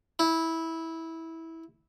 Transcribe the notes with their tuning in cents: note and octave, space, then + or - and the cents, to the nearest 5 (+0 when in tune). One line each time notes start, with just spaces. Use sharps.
E4 -15